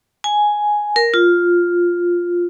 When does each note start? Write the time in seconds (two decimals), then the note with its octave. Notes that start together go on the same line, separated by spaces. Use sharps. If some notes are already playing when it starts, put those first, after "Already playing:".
0.24 G#5
0.96 A#4
1.14 F4